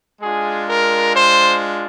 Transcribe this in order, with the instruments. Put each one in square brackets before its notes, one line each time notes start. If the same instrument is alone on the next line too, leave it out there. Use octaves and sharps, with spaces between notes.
[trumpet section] G#3 D4 F4 G#4
A#4
C5